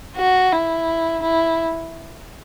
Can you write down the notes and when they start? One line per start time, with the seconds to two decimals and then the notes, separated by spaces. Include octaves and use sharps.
0.17 F#4
0.52 E4
1.23 E4